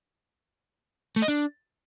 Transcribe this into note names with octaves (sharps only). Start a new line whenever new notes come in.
A3
D#5
D4